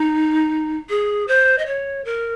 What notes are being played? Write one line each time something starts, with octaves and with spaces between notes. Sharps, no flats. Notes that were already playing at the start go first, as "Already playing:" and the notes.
Already playing: D#4
G#4
C5
D#5
C#5
A#4